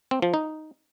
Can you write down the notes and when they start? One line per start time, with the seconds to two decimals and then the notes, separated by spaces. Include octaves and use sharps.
0.11 C4
0.22 F3
0.34 D#4